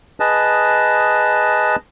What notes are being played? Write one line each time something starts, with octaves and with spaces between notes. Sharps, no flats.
G#4 B4 D#5 A5